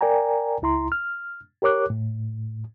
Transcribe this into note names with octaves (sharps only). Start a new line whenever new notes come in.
A#4 D5 G5 G#5 A#5
C#2 E4 A#5 C6
F6
G4 A#4 C#5 D6 F#6
A2